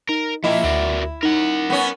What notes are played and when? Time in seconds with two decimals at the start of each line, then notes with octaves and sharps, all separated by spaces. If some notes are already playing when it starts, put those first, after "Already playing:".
0.09 D#4 A#4
0.44 F3 A#3 E4 A#4 D#5 G5
0.64 D2 F#4 A#4 D5
1.23 D#4 A#4 F#5
1.70 B3 C#4